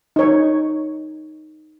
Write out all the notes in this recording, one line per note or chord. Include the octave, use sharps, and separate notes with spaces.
D#4 C#5